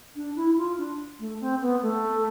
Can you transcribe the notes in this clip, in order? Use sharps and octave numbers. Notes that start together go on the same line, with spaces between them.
D4
E4
F4
D4
A3
C4
B3
A3